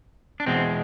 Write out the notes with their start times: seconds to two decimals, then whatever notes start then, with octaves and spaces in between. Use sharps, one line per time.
0.40 D4
0.46 E2 B2 G#3 C4